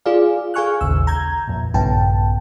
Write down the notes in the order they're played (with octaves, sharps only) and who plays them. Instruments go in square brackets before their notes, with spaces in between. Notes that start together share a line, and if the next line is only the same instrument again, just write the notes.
[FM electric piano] F4 G#4 D5 F5
G#4 F5 G#5 C#6 F6 F#6
A1 D#2 C#3 E6
A#5 G6 G#6
F2 A#2
A#1 G2 C#3 B3 G5 A5